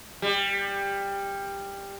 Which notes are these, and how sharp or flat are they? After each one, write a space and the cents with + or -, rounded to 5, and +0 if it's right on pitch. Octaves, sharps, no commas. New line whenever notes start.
G3 +15